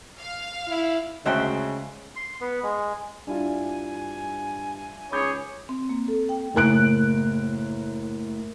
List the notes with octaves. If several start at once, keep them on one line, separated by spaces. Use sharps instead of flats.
F5
E4
D2 C#3 G#3 F#4 C5 E5 G5
C6
B3
G#3
G2 D4 E4 F4 G#5
C#2 G#4 C#5 B5 D6 G6
C4
A#3
A4
G5
F#1 A2 A#4 F#6 D7